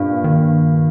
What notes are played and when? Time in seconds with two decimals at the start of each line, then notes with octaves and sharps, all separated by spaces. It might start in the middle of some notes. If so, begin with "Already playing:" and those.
Already playing: G2 A#2
0.24 D#3